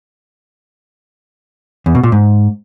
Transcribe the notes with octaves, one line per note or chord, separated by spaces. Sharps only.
E2
B2
A#2
G#2